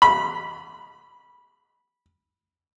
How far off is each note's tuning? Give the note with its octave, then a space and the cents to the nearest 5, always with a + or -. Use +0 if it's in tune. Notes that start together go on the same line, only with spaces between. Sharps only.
B5 -15